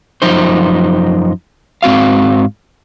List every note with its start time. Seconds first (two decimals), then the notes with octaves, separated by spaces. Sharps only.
0.22 F#2 F3 D#4 C5
1.83 G#2 C4 F#4 F5